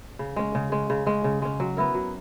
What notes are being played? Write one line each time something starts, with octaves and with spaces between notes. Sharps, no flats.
C#3
G#3 C#4
C#3
G#3 C#4
C#3
G#3 C#4
C#3
G#3 C#4
F#3
B3 E4 A#4
F#3